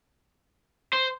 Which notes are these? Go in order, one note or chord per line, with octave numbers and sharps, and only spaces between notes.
C5